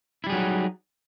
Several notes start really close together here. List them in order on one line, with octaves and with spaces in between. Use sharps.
E4 G3 G#4 F#3 D#4